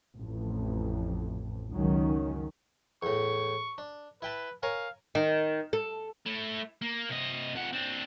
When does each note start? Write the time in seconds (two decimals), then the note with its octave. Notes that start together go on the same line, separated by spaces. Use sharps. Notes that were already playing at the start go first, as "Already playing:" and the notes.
0.16 A1 F2
1.73 C#2 F#2 D#3 F#3 C#4
3.03 E2 A2 C#6
3.78 D4
4.22 E4 B4 G5 A5
4.63 A#4 C#5 F5 G#5
5.15 D#3
5.73 A4
6.26 A3 E4
6.82 A#3
7.09 C3 D#5
7.55 F2 F#5
7.73 C4 D4